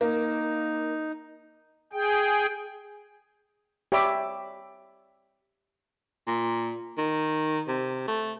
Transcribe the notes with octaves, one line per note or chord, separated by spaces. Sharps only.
A#3 D#4
G#4 G5
G4 C#5 D5 E5 B5 D6
A#2
D#3
C3
A3